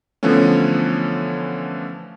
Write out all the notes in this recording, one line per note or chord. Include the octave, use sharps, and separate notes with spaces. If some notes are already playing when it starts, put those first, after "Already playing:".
D3 E3 F3 A3 B3 C#4